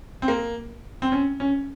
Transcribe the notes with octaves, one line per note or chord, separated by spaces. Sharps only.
C4
A#3
C4
C#4
C#4